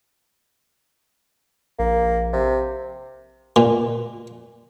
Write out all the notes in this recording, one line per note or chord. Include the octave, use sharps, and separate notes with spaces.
A#1 A#3
C3
A#2